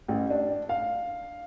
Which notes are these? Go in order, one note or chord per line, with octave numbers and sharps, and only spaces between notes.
A1
D4
F5